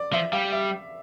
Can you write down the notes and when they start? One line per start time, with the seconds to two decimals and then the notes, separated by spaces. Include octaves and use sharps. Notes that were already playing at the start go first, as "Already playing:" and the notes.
Already playing: D5
0.13 F3 E5
0.32 G3 F5
0.52 E5